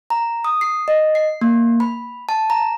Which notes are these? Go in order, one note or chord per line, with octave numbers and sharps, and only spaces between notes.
A#5
D#6
C7
D#5
C7
A#3
B5
A5
A#5